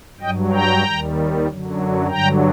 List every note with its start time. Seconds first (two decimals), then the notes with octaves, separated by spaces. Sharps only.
0.21 G2 F#3 D#5 G5
0.52 G5 A#5
0.85 D#2 D#3 G3
1.47 F#2 D3 F#3
2.09 G2 D3 F#3 G5 A#5